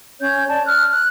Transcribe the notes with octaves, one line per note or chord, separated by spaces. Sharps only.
C#4 C#5 G6
D5 A5
F6 F#6
F#6